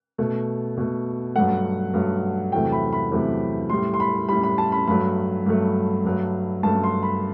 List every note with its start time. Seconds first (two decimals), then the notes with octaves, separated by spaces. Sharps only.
0.18 B2 A3
0.77 B2 A3
1.35 G2 F#3 A3 F#5
1.94 G2 F#3 A3
2.52 E2 C3 F#3 A3 G5
2.72 B5
2.93 B5
3.11 E2 C3 F#3 A3
3.70 A2 G3 C6
3.94 C6
4.00 B5
4.28 A2 G3 B5
4.43 B5
4.58 A5
4.72 B5
4.87 G2 F#3 A3 B5
5.46 G2 F#3 A3
6.05 G2 F#3 A3
6.63 G2 F#3 A3 A5
6.84 C6
7.03 B5